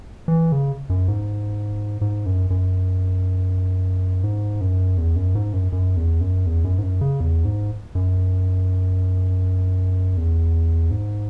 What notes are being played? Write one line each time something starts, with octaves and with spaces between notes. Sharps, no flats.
E3
C#3
F#2
G#2
G#2
F#2
F#2
G#2
F#2
E2
F#2
G#2
F#2
F#2
E2
F#2
E2
F#2
G#2
F#2
C#3
E2
G#2
F#2
E2
G#2